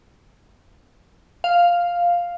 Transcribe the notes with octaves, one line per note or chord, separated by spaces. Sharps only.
F5